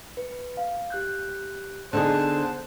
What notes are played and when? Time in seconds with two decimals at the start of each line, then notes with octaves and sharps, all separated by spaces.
0.17 B4
0.57 F5
0.90 G4 F#6 G6
1.93 D3 B3 D#4 G#4 C5 A5 F#6